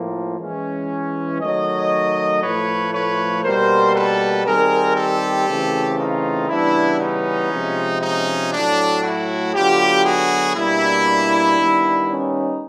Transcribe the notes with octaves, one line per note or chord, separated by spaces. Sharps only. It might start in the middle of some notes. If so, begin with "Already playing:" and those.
Already playing: A2 F3 A#3
E3 G#3 C#4
D#3 F#3 A3 C#5 D#5
A2 F3 A3 B4 C#5
B4 C#5
B2 G3 A#3 A#4 C5
A4 B4
D#3 G3 C4 G#4 A#4
G4 A4
C#3 E3 A3 C4
D#4 F4
C#3 E3 G3 B3 D4 E4
C#4 D#4
C3 F3 G#3
C#4 D#4
A2 F#3 A3 D4
E4 F#4
D3 F#3 B3 F4 G4
F#4 G#4
B2 G3 A#3 D4 E4
D#3 G3 B3
C#4 D#4